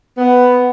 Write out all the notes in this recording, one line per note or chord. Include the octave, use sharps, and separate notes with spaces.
B3